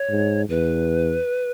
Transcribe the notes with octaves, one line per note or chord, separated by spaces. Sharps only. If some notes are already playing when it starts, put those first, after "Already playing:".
Already playing: C#5
G#2
E2 B4